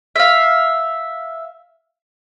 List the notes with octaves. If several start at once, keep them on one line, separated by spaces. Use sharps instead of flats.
E5 F5